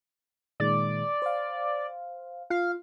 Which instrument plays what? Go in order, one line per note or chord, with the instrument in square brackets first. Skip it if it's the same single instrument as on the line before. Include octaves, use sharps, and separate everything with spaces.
[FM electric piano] A#2 D#3 G#3 [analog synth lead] D5
[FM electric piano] C5 F5
[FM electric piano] F4 [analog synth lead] F5